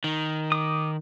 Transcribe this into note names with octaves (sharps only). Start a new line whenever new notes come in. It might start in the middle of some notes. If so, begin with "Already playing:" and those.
D#3
D6 D#6